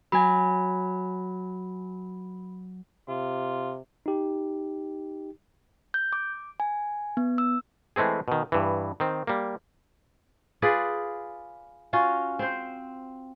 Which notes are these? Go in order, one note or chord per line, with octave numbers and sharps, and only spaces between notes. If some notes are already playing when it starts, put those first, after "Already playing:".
F#3 G#5 B5
C3 F4
D#4 G4
G6
D6
G#5
B3
E6
E3 G#3 A3 C4 G#4
B2 D#3
G2 E3
D#3 C4
G3 A#3
F4 G#4 B4 D5
C#4 F4 F#4
C4 C5